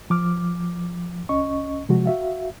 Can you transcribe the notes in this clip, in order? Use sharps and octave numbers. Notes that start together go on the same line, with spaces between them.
F3 D6 F6
C2 C#4 D#5 C#6
C3 F3 G#3 F#4
F#4 E5 F5